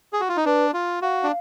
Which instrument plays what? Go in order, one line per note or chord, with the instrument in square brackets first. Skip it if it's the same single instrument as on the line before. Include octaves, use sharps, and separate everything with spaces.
[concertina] G#4
F#4
F4
D#4
[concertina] D4 [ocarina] B4
[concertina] F4
[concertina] F#4 [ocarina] F5
[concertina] D4